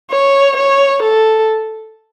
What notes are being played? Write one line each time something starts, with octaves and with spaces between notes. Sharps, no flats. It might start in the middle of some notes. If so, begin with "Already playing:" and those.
C#5
C#5
A4